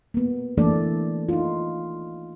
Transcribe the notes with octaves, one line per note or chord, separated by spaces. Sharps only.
A#3 B3
E3 A3 A#3 D4 A4 D5
D#4 F4